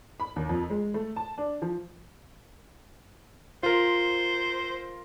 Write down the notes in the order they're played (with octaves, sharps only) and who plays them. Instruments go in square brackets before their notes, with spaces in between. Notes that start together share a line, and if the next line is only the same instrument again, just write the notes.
[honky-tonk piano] B5
D#2
F2
G#3
A3
A5
D4
F3
[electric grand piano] F4 A#4 [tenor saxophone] C5